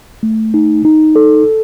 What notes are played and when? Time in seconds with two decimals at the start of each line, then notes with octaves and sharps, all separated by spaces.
0.23 A3
0.54 D#4
0.85 D#4
1.16 A4